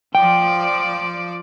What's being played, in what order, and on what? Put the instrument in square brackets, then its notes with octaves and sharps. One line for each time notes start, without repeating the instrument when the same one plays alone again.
[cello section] F3 D5 [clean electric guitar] G5